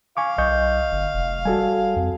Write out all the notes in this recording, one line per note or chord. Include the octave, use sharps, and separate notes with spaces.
F5 G#5 C#6 D6
B1 D#5 C#6 G6
G1
F1
G3 F#4 A4 G#5
F2